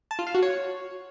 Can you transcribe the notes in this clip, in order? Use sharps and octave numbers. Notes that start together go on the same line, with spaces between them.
A5
F4
F5
F#4
C#5